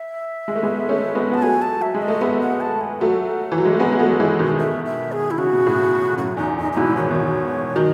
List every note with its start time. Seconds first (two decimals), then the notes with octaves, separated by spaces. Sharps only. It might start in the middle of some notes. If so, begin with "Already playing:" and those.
Already playing: E5
0.48 G#3
0.56 A3
0.63 G#3 B3
0.89 A3 C#4
1.15 G#3 B3
1.32 B3 A5
1.42 F#3 A3 G#5
1.62 A5
1.80 F#3 E5
1.95 G#3
2.02 D#5
2.08 A3
2.21 G#3 B3 E5
2.41 F#5
2.61 A5
2.81 G#5
3.01 F#3 A3 F#5
3.52 E3
3.58 F#3
3.65 G#3
3.73 A3
3.79 G#3 B3
3.93 G#3
3.99 F#3 A3
4.20 E3 G#3
4.39 B2 D#3
4.59 E5
4.85 E5
5.12 G#4
5.31 E4
5.38 C#3 F#4
5.53 B2
5.66 A2 C#3
6.17 F#2 A2 F#4
6.37 E2 D#4
6.58 E2 D#4
6.72 D#4
6.77 G#2 B2 E4
6.97 D#3 C#5
7.05 E3
7.11 B2 D#3
7.76 D#3 F#3 D#5